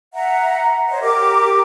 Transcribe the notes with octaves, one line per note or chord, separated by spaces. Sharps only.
E5 F#5 A#5
C5 C#5 D#5
G4 A#4 D6